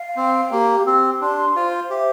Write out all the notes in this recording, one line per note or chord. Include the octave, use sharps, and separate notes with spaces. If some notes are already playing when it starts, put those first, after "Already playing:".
Already playing: F5
C4 G5
A#3 G4
C4 G4
D4 C6
F4 C5
G4 E5